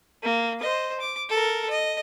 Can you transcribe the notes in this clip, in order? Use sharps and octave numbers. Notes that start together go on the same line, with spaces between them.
A#3
C5 D#5
D6
A4 A#4
D#5